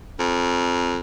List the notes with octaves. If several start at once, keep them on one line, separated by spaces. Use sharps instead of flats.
F2